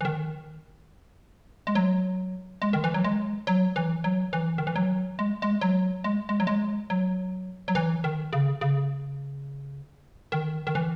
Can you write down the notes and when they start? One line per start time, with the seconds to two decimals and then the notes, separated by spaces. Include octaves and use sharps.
0.01 E3
0.05 D#3
1.67 G#3
1.75 F#3
2.62 G#3
2.73 D#3
2.84 E3
2.94 F#3
3.04 G#3
3.47 F#3
3.76 E3
4.04 F#3
4.33 E3
4.58 D#3
4.67 E3
4.76 F#3
5.19 G#3
5.42 G#3
5.61 F#3
6.04 G#3
6.29 G#3
6.40 F#3
6.47 G#3
6.90 F#3
7.68 F#3
7.75 E3
8.04 D#3
8.33 C#3
8.61 C#3
10.32 D#3
10.67 D#3
10.75 E3